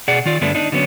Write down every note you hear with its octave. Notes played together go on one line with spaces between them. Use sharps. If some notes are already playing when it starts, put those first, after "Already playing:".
B2 G#4 D5 F#5
D#3 F4 D5
G2 D3 A3 B3 D4
D4 D#4
D3 F#3 B3 C#4